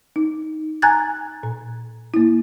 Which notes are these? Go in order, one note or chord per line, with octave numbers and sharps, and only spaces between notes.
D#4
G#5 A#5 F#6 G#6 A6
A#2
A#3 E4